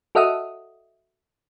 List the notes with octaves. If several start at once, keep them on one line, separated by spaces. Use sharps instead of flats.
F#4 A4 D#5 E5 F#5 D#6